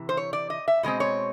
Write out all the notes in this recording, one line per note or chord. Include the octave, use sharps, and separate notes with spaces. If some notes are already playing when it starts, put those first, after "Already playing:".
Already playing: C3 E3
C5
C#5
D5
D#5
E5
B2 G#3 C4 D#5
C#5